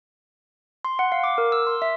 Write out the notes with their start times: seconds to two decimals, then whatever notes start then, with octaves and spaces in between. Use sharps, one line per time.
0.85 C6
0.99 F#5
1.12 F5
1.24 D6
1.38 A#4
1.52 E6
1.67 C6
1.82 E5